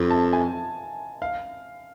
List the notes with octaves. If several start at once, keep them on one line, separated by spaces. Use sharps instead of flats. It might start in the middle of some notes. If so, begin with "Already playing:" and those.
Already playing: F2
A5
G#5
F5